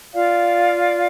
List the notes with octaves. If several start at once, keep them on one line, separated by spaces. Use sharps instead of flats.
F4 D5 F5